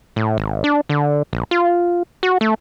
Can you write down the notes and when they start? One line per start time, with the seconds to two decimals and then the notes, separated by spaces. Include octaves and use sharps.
0.16 A2
0.38 G#1
0.64 D4
0.89 D3
1.33 A#1
1.51 F4
2.23 F#4
2.41 A3